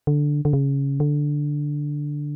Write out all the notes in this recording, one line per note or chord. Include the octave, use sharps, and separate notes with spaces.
D3
D3
C#3
D3